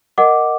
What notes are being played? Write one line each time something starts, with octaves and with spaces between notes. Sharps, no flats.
A#4 D#5 F#5 D6